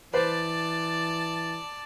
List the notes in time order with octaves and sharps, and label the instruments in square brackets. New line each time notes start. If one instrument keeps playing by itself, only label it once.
[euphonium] E3 [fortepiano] B4 C5 [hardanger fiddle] D5 A5